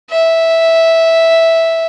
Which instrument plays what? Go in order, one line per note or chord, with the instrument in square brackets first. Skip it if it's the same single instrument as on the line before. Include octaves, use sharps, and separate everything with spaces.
[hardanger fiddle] E5